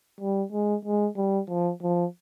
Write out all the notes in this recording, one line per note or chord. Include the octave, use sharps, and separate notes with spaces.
G3
G#3
G#3
G3
F3
F3